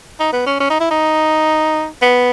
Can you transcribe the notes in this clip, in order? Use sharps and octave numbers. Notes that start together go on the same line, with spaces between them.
D#4
B3
C#4
C#4
D#4
E4
D#4
B3